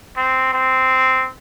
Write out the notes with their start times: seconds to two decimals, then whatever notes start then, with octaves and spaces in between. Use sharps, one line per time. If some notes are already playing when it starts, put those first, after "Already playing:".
0.17 C4
0.53 C4